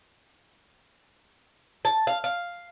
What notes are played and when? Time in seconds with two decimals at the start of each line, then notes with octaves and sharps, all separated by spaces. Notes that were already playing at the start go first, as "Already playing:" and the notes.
1.85 A5
2.07 F5
2.24 F5